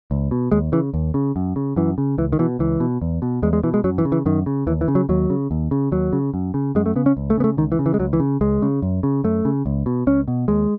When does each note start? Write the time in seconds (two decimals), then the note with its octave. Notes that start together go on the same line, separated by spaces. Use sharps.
0.11 C#2
0.31 B2
0.52 D#2 G#3
0.72 C#3 E3
0.94 D#2
1.14 C#3
1.36 F#2
1.56 C#3
1.76 F#2 E3
1.98 C#3
2.18 C#2 E3
2.33 D#3
2.39 B2 E3
2.59 C#2 E3
2.80 B2
3.02 E2
3.22 B2
3.43 E2 G#3
3.53 G#3
3.63 B2 E3
3.74 G#3
3.84 F#2 F#3
3.98 E3
4.05 C#3
4.12 E3
4.26 F#2 D#3
4.46 C#3
4.67 D#2 E3
4.81 E3
4.88 C#3
4.95 F#3
5.09 D#2 F#3
5.30 C#3
5.51 D#2
5.71 C#3
5.92 D#2 F#3
6.13 C#3
6.34 F#2
6.54 C#3
6.75 F#2 G#3
6.86 A3
6.96 C#3 B3
7.06 C#4
7.17 C#2
7.30 A3
7.37 C#3 B3
7.44 A3
7.57 C#2 D#3
7.72 E3
7.79 C#3
7.86 E3
7.94 G#3
7.99 C#2 F#3
8.13 E3
8.20 C#3
8.41 C#2 G#3
8.62 C#3
8.82 F#2
9.03 C#3
9.24 F#2 A3
9.45 C#3
9.66 C#2
9.86 B2
10.07 C#2 C#4
10.28 B2
10.48 D#2 G#3